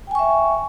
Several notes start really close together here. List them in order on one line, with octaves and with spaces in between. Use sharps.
G5 G#5 C#6 E5